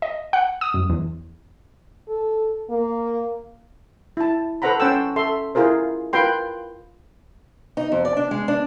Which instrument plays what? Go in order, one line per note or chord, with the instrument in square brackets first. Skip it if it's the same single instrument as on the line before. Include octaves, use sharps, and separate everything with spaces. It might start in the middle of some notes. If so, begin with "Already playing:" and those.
[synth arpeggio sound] D#5
F#5
D#6
F#2
E2
[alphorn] A4
A#3
[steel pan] E4 A5
A4 B4 C5 F#5 A#5 B5
C#4 C5 F#5 G5 A5 E6
A4 E5 C6
E4 F4 G#4 A#4 C5
F4 A#4 B4 G5 C6
[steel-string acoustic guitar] D#4
F2
D5
D4
G#3
D4